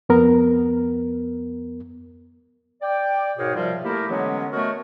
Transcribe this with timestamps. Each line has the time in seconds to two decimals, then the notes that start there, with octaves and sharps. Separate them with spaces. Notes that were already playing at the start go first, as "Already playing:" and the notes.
0.09 F2 B3 A#4
2.82 D5 G5
3.38 G#2 B2 G#4 A#4 C5 C#5
3.56 C3 F3 G3 F4 A#4 F5
3.85 A3 A#3 E4 G4 A4 A#4
4.10 D3 E3 F#3 G#3 B3 C#4
4.52 A3 B3 F#4 A#4 C#5 D#5